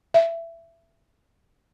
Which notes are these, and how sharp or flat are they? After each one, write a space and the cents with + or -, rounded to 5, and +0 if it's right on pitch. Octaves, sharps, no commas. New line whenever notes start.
E5 +20